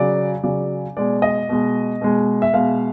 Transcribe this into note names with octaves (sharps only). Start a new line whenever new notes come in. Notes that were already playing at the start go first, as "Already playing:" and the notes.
Already playing: C#3 F#3 D5
C#3 F#3 D5
B2 G#3 D5
D#5
B2 G#3
B2 G#3
E5
B2 G#3 F5